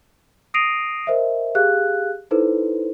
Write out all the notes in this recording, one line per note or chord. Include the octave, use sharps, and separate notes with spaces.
D#6 A#6 C7 D7 D#7 F7
A#4 C5 D#5 E5
G4 G#4 F5 F#6
D#4 E4 A4 B4 C5